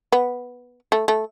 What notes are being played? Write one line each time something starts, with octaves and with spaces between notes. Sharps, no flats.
B3
A3
A3